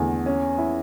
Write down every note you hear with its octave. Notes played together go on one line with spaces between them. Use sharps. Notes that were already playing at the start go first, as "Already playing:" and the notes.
Already playing: E2 D3 A3
C#4
E4